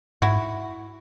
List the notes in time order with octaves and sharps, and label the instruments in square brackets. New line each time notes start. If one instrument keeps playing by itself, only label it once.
[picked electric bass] G#2 [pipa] E4 F#4